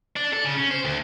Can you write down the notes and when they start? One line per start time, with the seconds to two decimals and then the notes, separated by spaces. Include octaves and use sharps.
0.16 D4
0.33 A4
0.44 C#3
0.56 C#4
0.71 C5
0.85 D2